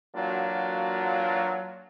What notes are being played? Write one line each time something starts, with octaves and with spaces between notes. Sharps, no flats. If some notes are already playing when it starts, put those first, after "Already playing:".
E3 F#3 A#3 D4 F4 F#4